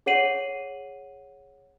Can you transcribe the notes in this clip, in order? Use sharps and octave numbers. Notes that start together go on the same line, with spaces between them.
G#4 C#5 F#5 C7 D#7 F#7